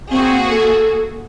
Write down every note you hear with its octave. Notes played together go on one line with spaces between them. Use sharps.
A#3 C4 F#4 G#4
A4